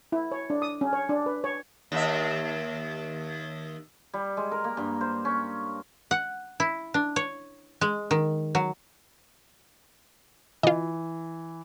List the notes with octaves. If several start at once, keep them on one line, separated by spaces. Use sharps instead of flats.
E4
C#5
D4
D#6
C#4
C#5
D4
B4
C#5
D#2 E5
G3
G#3
A#4
A#3
G2
C5
C#4
F#5
E4
D4
C#5
G#3
D#3
F#3
E3 F4 D#5